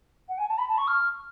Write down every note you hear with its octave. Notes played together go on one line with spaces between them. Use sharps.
F#5
G#5
A5
B5
A5
C#6
F6